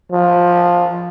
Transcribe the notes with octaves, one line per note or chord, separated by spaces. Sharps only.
F3